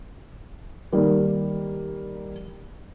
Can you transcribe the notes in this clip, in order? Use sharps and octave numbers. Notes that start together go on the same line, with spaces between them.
D#3 G3 A#3